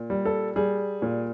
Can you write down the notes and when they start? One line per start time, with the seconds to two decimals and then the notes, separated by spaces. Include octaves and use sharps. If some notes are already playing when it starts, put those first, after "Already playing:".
Already playing: A#2
0.10 G3
0.25 A4
0.56 G3 G#4
1.02 A#2